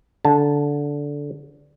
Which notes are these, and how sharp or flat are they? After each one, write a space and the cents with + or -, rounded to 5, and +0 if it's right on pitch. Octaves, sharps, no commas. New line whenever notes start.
D3 -15 A5 -10